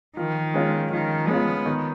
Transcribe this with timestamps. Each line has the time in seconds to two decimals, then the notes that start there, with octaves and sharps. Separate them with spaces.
0.17 D#3 F3
0.54 G#3 C#4 F4
0.92 D#3 F3
1.29 G#3 B3 C#4 F4
1.66 D#3